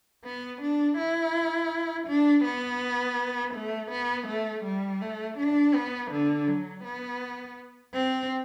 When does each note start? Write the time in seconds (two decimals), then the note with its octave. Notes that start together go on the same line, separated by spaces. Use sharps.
0.24 B3
0.62 D4
0.98 E4
2.08 D4
2.45 B3
3.55 A3
3.91 B3
4.28 A3
4.65 G3
5.01 A3
5.38 D4
5.74 B3
6.11 D3
6.48 F#3
6.84 B3
7.94 C4